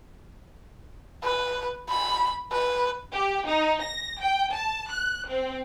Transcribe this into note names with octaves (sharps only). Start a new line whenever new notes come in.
B4
B5
B4
G4
D#4
A#6
G5
A5
F#6
C4